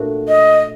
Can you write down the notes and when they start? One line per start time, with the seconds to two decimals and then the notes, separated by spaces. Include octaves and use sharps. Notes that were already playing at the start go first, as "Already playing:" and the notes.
Already playing: A#2 A3 D4 F#4
0.28 D#5